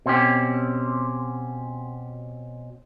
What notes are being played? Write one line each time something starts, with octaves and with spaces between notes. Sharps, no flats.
B2 C4 C#4 G4